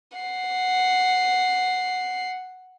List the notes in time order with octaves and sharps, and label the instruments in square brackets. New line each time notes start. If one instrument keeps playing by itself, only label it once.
[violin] F#5 C7